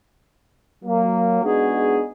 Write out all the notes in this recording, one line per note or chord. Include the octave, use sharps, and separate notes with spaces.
F#3 A#3
G#3 B3 D4 D#4 F#4 G#4